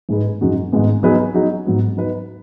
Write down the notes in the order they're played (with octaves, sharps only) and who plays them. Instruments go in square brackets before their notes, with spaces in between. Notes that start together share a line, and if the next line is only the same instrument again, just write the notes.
[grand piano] G#2 G#3 D#4 G#4 B4
F#2 C#3 G#3 D#4 F#4
G#2 D#3 G#3 B3
F#3 B3 D#4 G#4 B4
F#3 D#4 G#4
G#2 F#3 B3
F#3 D#4 B4